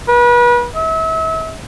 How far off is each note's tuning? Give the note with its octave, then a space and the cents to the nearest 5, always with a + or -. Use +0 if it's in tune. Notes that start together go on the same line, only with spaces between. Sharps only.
B4 -35
E5 -35